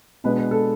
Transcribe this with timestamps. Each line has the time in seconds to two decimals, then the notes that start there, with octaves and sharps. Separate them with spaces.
0.24 B2 G#3 B3 D4 B4
0.38 B4
0.51 A4